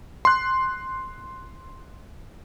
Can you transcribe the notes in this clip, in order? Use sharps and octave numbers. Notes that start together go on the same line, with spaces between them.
C6 F#6